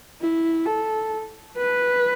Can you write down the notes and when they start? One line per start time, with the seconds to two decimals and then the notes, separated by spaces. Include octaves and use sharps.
0.21 E4
0.66 A4
1.56 B4